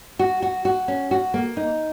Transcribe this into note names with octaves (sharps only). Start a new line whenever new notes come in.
F#4
F#4
F#4
C#4
F#4
A#3
D#4